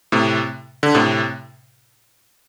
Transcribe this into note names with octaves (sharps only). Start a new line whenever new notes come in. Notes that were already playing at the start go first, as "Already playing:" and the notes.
A2 C3
D3
A2 C3